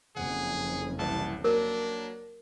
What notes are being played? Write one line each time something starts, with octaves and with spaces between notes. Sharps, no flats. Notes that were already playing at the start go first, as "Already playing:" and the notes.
F#1 F2 C#3 G#4 F#5
C2 E3 A5
F#3 A#3 D4 A#4